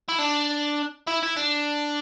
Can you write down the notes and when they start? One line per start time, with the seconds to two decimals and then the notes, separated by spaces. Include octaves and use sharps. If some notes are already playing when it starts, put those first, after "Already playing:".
0.08 E4
0.18 D4
1.07 E4
1.23 E4
1.37 D4